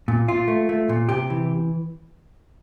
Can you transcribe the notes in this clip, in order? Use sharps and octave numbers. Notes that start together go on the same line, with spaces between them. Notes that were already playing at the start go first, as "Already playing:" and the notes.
A#2
A#2 F4
A3
A3
A#2
C3 G4
E3